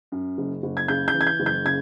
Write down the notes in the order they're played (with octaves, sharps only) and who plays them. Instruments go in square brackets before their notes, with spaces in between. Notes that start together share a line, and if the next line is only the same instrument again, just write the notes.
[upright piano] F#2
F#1
F#1
G#6
C#3 G6
G6
E3
G#6
G6
F#1
G6
C#3 G#6